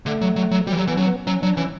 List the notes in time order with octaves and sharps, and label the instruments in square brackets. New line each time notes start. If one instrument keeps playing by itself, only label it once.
[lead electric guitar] D3 [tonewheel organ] A3
[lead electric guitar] F#3
F#3
F#3
[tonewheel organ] F#3 [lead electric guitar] G3
[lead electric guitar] E3
[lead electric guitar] F#3 [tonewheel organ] G3
[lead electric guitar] E3 [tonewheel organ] B3
[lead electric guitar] F#3 [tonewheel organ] C#4
[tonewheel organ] B3
[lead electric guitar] F#3 [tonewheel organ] C#4
[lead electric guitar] F#3 [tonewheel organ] D4
[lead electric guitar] E3 [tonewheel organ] C#4